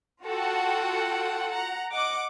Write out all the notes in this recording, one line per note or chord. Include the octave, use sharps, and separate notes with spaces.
F4 F#4 A4 F#5 G5
F#5 A#5
D#5 F#5 D6